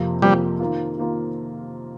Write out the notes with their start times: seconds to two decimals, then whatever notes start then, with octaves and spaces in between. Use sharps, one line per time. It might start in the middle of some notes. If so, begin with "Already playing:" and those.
Already playing: F2 C3 F3 A#3 F4
0.22 F2 C3 F3 G3 A#3 F4
0.60 D#3 A#3 F4
0.98 D#3 A#3 F4